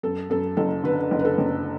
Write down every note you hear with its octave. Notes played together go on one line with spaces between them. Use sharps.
F#2 A4
F#2 A4
F#1 A4
D3 B4
F#1
B4
A4
F#1